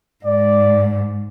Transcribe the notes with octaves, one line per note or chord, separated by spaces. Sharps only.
G#2 D5